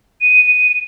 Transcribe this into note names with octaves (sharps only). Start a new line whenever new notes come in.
D#7